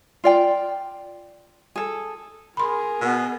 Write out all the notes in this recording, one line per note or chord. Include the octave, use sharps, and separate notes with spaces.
F4 D5 G5
G#4 A4
G#4 A#4 B5 C6
B2 B3